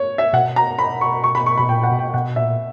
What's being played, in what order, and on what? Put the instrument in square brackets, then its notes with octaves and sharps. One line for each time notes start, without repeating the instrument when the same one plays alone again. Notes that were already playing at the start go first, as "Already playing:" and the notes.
Already playing: [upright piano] C#5
E5
[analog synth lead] B2 [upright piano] F#5
[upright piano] A#5
B5
C#6
C#6
B5
C#6
[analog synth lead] B2 [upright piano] B5
[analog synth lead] A#2 [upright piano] G5
[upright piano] F#5
[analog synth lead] B2
[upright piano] G5
[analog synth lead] B2 [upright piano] F#5
[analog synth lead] A#2 [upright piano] E5